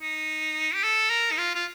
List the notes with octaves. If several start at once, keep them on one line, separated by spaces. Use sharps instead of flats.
D#4
G4
A4
A#4
D#4
F4
F4